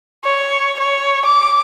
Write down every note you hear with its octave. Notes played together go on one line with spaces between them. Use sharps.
C#5
C#5
D6